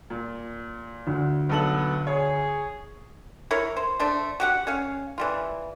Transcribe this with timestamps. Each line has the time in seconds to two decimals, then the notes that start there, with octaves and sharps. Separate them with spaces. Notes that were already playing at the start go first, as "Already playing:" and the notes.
0.10 A#2
1.07 D2
1.49 B1 B3 A4 F#7
2.07 G#4 C#5
3.51 E4 A#4 C#5
3.77 C5
3.99 A3 D4 C5
4.40 F#4 G4 F#5
4.67 C#4 C#5 F5
5.18 E3 G3 F4